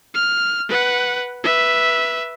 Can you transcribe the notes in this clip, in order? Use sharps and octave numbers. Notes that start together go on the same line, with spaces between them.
F6
B4 F#5
B4 E5